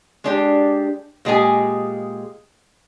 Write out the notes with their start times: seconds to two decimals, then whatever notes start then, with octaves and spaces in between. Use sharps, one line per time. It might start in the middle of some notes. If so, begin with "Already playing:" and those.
0.24 G#3 D4 G4
1.25 A#2 G#3 G4 G#4 G#5